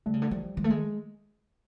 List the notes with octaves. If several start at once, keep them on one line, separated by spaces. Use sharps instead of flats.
D3 G3 A3
C#3
D3
E3 F3 G3
D#3 F3 G#3
A3
D#3 G#3